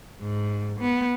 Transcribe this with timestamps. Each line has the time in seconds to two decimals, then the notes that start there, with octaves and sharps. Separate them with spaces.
0.21 G#2
0.80 B3